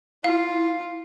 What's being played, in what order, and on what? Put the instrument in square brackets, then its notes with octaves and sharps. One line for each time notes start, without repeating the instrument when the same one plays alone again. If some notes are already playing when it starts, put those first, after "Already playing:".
[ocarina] E4 [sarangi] F4 [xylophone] F5